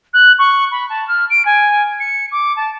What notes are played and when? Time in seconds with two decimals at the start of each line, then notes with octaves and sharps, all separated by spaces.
0.13 F#6
0.38 C#6
0.71 B5
0.89 A5
1.08 F6
1.30 D7
1.45 G#5
2.00 C#7
2.32 D6
2.57 A5